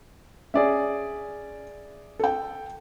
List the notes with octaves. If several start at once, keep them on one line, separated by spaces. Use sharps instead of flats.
C#4 G#4 D5 E5
A4 G5